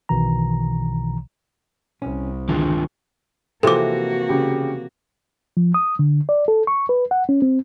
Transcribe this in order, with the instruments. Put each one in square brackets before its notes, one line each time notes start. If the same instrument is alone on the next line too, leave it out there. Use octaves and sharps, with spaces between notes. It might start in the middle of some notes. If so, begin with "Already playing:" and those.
[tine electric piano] B1 B2 D#3 E3 A#5
[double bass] C2 [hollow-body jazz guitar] C#4
[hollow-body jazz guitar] E2 D3 [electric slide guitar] D#3 D4 F4
[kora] C3 E3 F3 [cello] A#3 F#4 [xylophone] A4 D6
[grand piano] C#3 G4
[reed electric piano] F3
D#6
D3
D5
A4
C#6
B4
F#5
C#4
C4